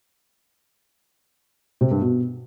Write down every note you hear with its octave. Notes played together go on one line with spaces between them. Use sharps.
C3
G2
B2